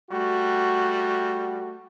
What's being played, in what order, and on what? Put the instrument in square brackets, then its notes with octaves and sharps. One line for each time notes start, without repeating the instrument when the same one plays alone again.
[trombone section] G3 A3 F#4